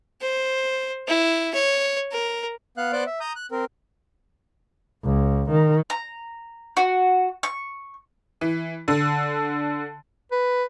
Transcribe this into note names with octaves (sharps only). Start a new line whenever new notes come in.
C5
E4
C#5
A#4
B3 F5 F#6
B3 C5 D5 D6 F#6
E5
A#5 D#6 G6
F#6
C4 A#4
C#2
D#3
A#5
F#4
C#6
E3
D3
B4